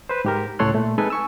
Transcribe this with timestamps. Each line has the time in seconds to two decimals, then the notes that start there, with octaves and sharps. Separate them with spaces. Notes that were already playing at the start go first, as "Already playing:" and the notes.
0.09 B4 C5
0.25 G#2 G4 A#4
0.59 C#2 A2 A4 C#5 C6 F#6
0.74 A#2 A3
0.98 G#3 C4 D#4 A4 B4 G#5
1.10 G#5 C#6 E6